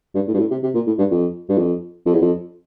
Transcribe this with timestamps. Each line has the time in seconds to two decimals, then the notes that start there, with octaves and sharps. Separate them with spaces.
0.15 G2
0.27 A2
0.34 G2
0.39 A2
0.51 C3
0.63 C3
0.74 A#2
0.87 A2
0.99 G2
1.11 F2
1.49 G2
1.58 F2
2.06 F2
2.14 E2
2.22 F2